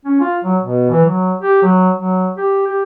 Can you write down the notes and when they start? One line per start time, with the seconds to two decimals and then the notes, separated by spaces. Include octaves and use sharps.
0.05 C#4
0.20 F4
0.44 F#3
0.62 B2
0.90 E3
1.06 F#3
1.41 G4
1.63 F#3
1.96 F#3
2.37 G4
2.67 G4